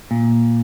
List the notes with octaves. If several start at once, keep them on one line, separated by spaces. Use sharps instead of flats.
A#2